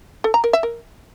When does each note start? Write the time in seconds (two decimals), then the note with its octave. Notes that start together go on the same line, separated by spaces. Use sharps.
0.24 A4
0.34 A#5
0.44 A#4
0.53 E5
0.63 A#4